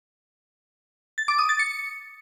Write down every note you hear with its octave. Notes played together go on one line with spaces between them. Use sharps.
A6
D6
D#6
A6
C#7